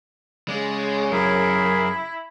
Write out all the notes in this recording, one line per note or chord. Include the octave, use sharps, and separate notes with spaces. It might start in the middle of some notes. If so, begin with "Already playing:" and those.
C#3 G#3 D5
F#2 E4 G#4 A#4